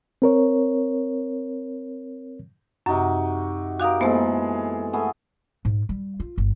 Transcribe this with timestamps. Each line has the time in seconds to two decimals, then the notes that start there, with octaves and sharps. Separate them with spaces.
0.22 C4 A#4 C#5
2.86 F#2 C3 D#4 F#4
3.80 F#4 G4 A#4 F5 D#6
4.01 E3 G#3 A#3 B3 A4 C5
4.93 A3 B3 G#4
5.65 G#2
5.89 G3
6.20 F4
6.38 G1